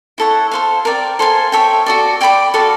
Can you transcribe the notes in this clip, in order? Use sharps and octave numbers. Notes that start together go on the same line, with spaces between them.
E4 A4 C#5 F#5
A4 C5 F5
A#4 D5 G5
A4 C5 F5 G#5
A4 C#5 E5 G5
F#4 A4 D5
D5 G5 B5 D6
F#4 A4 D5 F5